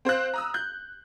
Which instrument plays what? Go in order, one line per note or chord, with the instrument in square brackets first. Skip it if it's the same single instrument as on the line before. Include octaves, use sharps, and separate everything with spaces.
[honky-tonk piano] C4 C5 F5 F#6
A#5 D#6 E6
F#6 G6